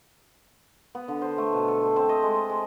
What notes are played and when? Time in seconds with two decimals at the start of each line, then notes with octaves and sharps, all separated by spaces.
0.95 B3
1.08 D3
1.22 C5
1.38 A3
1.53 B2
1.68 A4
1.81 C5
1.96 C4
2.09 D#5
2.23 G#3
2.35 A5
2.50 G#3